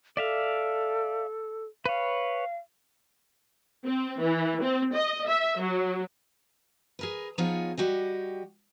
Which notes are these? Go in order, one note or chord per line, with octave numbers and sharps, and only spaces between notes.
A4 D5 E5 F5
B4 C#5 F5
C4
E3
C4
D#5
E5
F#3
G#4 A#4 B4
F3 B3 D#4 F4 G#4 C#5
G3 F#4 G4 D#5